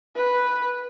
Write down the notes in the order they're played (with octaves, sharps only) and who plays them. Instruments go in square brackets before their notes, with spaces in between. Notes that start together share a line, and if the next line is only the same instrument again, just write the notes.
[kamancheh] B4